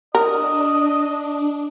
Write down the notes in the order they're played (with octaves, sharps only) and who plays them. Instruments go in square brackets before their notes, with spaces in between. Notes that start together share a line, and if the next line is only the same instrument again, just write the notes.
[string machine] D4 [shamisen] A#4 [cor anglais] D#5